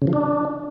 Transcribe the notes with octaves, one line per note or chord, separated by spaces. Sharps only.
C#3
F3
D4